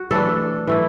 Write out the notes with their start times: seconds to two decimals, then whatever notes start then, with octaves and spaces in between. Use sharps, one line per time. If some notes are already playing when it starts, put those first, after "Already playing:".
Already playing: F#4
0.11 E3 A3 D4 A4
0.67 E3 A3 E4